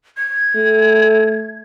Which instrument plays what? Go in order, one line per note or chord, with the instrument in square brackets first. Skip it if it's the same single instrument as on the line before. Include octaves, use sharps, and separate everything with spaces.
[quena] G#6
[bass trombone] A3